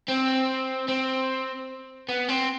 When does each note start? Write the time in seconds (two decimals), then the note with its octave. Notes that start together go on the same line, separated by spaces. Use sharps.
0.08 C4
0.88 C4
2.09 B3
2.29 C4